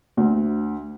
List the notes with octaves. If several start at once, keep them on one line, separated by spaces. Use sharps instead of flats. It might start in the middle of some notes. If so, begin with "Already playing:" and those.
D2